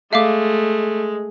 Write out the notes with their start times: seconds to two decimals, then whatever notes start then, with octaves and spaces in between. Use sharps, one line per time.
0.13 G#3 A3 E5 F5 D6